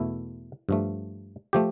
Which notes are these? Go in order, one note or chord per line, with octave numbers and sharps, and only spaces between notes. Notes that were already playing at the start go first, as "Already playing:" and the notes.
Already playing: E2 B2 A3 E4
G2 F3 A3
F3 A3 G4